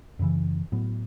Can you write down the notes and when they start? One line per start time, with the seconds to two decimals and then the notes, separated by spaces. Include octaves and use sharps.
0.19 F#2 C#3 E3
0.72 A2 F#3 B3